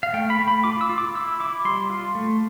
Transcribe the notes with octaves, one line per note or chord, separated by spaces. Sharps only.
F5
A3 G5
B5
A3
B5
F4 D6
E6
F4
D6
E4 E6
E4 D6
G3 C6
F4
A3